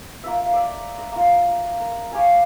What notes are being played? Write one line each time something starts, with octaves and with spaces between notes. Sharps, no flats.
A#3 F4 E5
D5 E5
D#5 D#6
A#3 F4
A#4
G4 C#5 F5 G#5